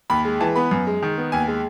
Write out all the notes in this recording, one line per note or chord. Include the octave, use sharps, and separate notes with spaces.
D#2 B5
G#3
E3 A5
B3 B5
F#2
G#3
D#3
B3
D#2 G#5
G#3